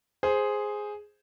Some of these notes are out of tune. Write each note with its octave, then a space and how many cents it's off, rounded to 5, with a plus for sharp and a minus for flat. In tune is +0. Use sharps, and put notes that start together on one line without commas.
G#4 +0 C5 +0